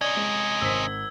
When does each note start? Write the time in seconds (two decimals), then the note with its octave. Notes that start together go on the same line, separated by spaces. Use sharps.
0.01 C3 C#4 D5 D#5 G#6 G7
0.17 G#3
0.61 G#1 C4 E6 B6